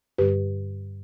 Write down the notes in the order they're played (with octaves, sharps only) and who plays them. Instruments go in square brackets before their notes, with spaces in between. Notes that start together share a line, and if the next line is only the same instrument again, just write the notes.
[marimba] G2 D3 G3 G4 B4